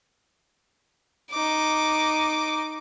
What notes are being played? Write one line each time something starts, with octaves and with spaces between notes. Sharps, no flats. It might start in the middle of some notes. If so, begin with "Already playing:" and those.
D#4 D6